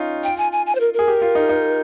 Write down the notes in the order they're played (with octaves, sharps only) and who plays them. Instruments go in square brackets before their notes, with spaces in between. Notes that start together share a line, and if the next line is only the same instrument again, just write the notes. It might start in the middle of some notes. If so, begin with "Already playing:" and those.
Already playing: [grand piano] C#4 D#4 F4
[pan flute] G5
G#5
G#5
G#5
C5
A#4
A#4
[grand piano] G#4
G4
F4
D#4
D#4